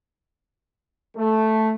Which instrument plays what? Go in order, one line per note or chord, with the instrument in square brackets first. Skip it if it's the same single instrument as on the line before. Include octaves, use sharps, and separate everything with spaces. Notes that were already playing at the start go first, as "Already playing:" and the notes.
[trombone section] A3